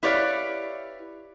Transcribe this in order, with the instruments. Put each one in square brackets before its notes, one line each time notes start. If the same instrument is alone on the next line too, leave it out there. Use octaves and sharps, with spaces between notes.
[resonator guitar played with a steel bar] E4 G4 B4 C#5 D5 F5